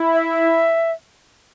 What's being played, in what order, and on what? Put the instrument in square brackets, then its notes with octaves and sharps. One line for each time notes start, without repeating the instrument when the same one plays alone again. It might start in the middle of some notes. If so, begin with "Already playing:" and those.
Already playing: [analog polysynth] E4
[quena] E5